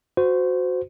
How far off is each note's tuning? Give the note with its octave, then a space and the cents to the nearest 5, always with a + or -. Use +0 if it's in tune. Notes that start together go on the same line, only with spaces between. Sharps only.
F#4 -10 C5 -25